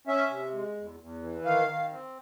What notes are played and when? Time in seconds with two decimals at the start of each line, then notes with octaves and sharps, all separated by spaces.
0.07 C#4 E5
0.30 C3
0.53 G#3
0.77 E2
1.00 E2
1.23 E3
1.45 D#3 F5
1.69 D#3
1.91 C4